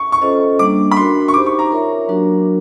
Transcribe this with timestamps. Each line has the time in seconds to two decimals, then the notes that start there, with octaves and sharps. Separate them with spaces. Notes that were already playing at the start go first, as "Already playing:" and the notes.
Already playing: C#6
0.12 C#6
0.22 C#4 F4 A4 C5 D#5
0.59 G3 A#3 D4 D6
0.91 B5
0.96 D4 F#4 A#4 C6
1.28 C#6
1.34 D#4 G4 C5 D6
1.46 C#6
1.59 A#5
1.71 F4 A#4 C#5 E5
2.08 F#3 A#3 D4 F#4 A#4